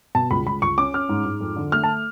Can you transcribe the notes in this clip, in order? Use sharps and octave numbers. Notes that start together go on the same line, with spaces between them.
B2 A5
C#2 B5
C#2 B5
C#2 C#6
C#4 D6
C#4 F6
G#2
G#2
F2
D3
A3 F6
A5